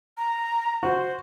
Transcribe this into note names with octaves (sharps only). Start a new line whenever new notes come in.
A#5
F#4 C5